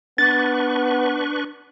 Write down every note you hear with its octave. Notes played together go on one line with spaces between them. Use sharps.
B3 D4 B4 C#6 A6